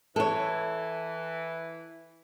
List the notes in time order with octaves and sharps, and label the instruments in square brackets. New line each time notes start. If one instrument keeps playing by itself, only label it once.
[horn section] E3 [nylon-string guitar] A4 C#5